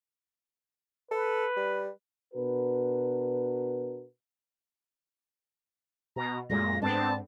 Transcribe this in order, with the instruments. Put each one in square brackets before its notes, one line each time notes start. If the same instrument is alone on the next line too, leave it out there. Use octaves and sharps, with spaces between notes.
[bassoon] A4 [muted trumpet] B4
[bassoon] G3
[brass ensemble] B2 D4 F#4 A#4 B4
[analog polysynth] B2 [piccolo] A#5
[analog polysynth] F#2 A#2 [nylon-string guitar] G#3 A3 [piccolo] A#6
[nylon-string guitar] G#2 [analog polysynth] B3 C4 D4 [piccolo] A5